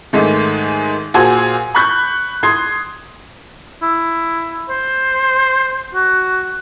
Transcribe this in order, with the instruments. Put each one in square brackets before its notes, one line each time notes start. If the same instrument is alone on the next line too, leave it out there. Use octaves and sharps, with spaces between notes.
[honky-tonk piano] G#2 D#3 G#3 A3
A#2 F#4 G#4 C5 G#5
B5 C#6 F#6 G6
C6 D#6 G#6 C7
[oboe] E4
C5
F#4